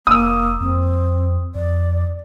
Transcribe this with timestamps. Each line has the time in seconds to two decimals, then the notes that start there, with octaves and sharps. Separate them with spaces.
0.07 F1 A#3 D#6 E6
0.61 F2 C4
1.55 F2 D5